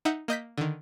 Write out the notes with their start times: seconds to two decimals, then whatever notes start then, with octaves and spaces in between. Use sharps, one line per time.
0.05 D#4 E5 F#5 G6
0.28 A#3 D#5 G6 B6
0.58 D3 D#3